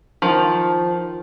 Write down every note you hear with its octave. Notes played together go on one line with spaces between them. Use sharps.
D#3 F3